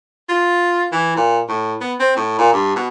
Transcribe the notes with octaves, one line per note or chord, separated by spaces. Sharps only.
F4
E3
A#2
A2
B3
C4
A2
A#2
G2
B2